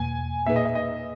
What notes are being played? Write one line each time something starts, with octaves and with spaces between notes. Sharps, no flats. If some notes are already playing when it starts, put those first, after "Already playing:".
Already playing: E2 B2 A#3 G#5
A#2 A#3 D#4 G#4 B4 E5
D#5
E5
D#5